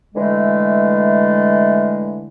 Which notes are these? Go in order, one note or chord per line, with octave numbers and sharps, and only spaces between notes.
D3 E3 G#3 A3